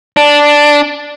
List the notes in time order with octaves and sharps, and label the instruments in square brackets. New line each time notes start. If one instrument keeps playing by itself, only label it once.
[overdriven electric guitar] D4